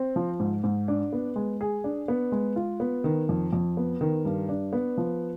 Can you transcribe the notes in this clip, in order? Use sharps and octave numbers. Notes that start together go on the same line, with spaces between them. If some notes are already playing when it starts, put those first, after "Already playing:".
Already playing: C4
F3
G#2
G#2
D4
B3
G#3
G#4
D4
B3
G#3
F4
B3
D#3
F2
F2
B3
D#3
G2
D4
B3
F3